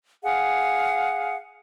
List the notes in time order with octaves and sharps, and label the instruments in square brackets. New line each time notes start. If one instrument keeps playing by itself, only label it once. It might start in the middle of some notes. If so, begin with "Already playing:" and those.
[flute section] G#4 F5 F#5